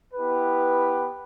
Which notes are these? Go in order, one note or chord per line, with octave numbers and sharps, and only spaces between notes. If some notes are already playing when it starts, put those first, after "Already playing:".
B3 E4 G4 B4